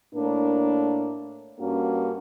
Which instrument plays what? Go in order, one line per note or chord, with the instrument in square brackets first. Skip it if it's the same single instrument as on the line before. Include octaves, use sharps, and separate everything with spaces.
[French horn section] A2 A#3 D4 A#4
G2 A#3 C#4 F#4